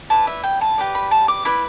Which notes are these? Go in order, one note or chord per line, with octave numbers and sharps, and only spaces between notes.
E4 B4 D5 A5
E5
G5
A5
G4 B4 D5
B5
A5
D6
E4 B4 D5 B5